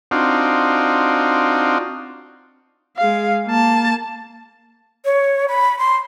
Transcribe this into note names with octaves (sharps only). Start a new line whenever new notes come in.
C4 D4 D#4 F4 F#4
G#3 F5
A#3 A5
C#5
B5
C6